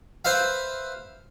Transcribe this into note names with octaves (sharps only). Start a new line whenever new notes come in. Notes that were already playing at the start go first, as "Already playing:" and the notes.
B4 C5 E5 F5